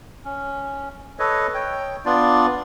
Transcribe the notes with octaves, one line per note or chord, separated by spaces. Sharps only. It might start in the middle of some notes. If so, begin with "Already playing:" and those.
C#4
A4 B4 C#5 D#5
C#5 G5
B3 D4 F4 D5